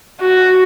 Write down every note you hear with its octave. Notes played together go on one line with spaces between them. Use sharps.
F#4